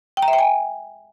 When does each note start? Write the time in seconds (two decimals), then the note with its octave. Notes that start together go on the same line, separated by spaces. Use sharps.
0.17 G5
0.22 A#5
0.28 E5
0.33 G5
0.39 G#5